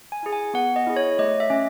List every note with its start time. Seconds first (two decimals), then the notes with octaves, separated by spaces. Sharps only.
0.12 G#5
0.23 E4 G#4
0.33 G#5
0.54 B3 F#5
0.76 D#5
0.87 E4 G#4
0.96 C#5
1.19 A3 D#5
1.40 E5
1.50 C#4